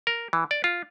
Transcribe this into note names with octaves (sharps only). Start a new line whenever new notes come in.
A#4
E3
D5
F4